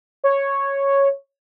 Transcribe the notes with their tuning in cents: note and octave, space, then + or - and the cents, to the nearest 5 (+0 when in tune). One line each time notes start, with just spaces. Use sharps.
C#5 -5